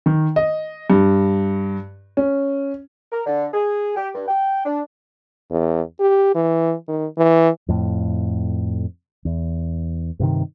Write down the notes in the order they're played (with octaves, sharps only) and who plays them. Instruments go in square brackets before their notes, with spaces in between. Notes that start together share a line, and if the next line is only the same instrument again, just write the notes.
[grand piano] D#3
D#5
G2
C#4
[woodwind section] A#4
D3
G#4
G4
G2
G5
D4
[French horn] E2
G4
E3
D#3
E3
[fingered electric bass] F2 A2
E2
G2 C3 D#3